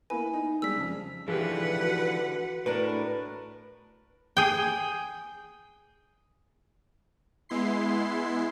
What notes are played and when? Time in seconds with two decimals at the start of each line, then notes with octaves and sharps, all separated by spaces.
0.10 A#3 E4 B4 G#5
0.33 D#4
0.62 G3 G#3 E6 B6
0.75 F2 C#3
1.28 D3 E3 F3 G4 G#4 B4 F#5
1.81 F#4 F#6
2.66 A2 D4 A#4 B4
4.37 G#4 G5
7.49 G#3 B3 E4 C6 C7